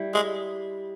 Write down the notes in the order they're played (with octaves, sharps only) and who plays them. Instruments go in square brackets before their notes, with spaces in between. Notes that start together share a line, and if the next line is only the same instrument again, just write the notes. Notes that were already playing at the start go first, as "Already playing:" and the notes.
Already playing: [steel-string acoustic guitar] G3 E4
[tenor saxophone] G#3